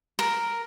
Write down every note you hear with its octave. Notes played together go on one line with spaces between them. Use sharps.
A#4